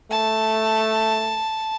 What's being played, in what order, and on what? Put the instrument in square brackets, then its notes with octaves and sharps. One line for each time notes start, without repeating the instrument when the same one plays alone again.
[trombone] A3 [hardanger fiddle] A5